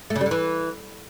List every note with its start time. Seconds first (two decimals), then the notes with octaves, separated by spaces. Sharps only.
0.10 A3
0.16 C#3
0.21 G3
0.26 D3
0.31 E3